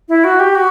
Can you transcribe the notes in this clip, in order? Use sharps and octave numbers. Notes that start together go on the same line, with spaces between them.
E4
F#4
G4
F#4